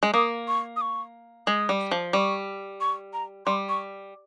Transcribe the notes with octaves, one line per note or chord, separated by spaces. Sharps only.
G#3
A#3 D#6
C#6
D#6
C#6
G#3 D#6
G3
F3
G3 C#6
C#6
A#5
G3 C6
C#6